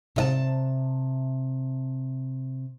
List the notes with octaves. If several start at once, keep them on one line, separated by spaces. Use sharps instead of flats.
C3 D#5 A5